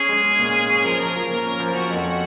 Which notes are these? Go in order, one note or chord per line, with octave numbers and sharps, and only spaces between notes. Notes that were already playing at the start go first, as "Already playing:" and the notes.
Already playing: C#4 G#4
G#3
C#4
A#2
C#4
C#4
F3 A#4
F3
F3
A#3
C#4
F3
C#4 F#4
F2